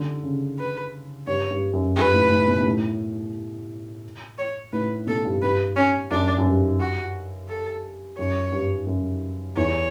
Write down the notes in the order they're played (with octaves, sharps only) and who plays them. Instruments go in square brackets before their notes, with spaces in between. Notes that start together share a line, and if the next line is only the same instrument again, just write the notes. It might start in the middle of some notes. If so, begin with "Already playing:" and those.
Already playing: [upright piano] D3
C#3
[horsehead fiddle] B4
[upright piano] G2 [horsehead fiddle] C#5
[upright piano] G2
F#2
[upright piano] G2 [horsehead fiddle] B4
[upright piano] A2
A2
B2
B2
A2
[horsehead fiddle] C#5
[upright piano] A2 [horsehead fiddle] B4
[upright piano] B2 [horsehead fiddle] A4
[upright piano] G2
[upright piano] G2 [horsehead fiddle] B4
[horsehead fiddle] C#4
[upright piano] F#2 [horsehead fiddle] D4
[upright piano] F#2
G2
[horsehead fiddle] F#4
A4
[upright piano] F#2 [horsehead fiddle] C#5
[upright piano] G2
F#2
[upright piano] E2 [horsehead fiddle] C#5